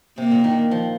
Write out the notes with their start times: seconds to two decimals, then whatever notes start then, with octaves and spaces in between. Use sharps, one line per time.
0.18 C3 A#3
0.31 A#2
0.44 D#3
0.71 F3